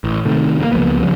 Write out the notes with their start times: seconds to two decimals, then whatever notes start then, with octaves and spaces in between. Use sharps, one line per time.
0.04 A1
0.25 C3 D#3 A3
0.60 G2 A#3
0.72 C#2 F3 A#3 B3
1.00 C#3 F3 G3